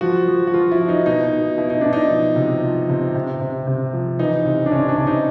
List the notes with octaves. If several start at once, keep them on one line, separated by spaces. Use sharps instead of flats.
F3 F#4
F3
F#4
F3 F4
E4
F3
D#4
B2 D#4
B2
B2 E4
D#4
B2 D4
D#4
F3
C3
F3
C3
C3
C3
C3
F3
E3 D#4
C3
D4
C3 C#4
D4
C3
D#4